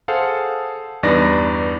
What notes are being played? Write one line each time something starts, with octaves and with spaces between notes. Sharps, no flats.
G#4 A4 C5 F5 F#5
E2 G2 D#4 B4 D5 A#6